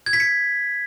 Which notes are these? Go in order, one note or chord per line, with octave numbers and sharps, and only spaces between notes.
G#6
B6
C#7